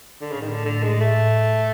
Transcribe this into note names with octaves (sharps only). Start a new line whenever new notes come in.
D3
A2 C#3
D#3
D3
D3
G#3
A3